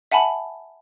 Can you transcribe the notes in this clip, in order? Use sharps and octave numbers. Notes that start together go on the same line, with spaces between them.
E5 F#5 G#5 A5 B5